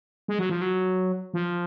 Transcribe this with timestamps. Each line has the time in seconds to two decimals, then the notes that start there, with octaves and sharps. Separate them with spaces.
0.28 G#3
0.39 F#3
0.49 F3
0.61 F#3
1.34 F3